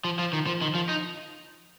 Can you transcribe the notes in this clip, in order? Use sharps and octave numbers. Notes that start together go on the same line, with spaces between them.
F3
F3
D#3
F3
D#3
F3
D#4